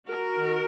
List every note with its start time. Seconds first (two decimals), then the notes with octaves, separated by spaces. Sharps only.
0.08 F#4 A#4
0.37 D#3